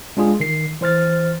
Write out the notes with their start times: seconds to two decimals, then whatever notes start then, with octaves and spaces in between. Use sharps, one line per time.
0.17 G#3 D4 F4 G#4
0.40 D#3 C7
0.81 E3 C5 F6 A6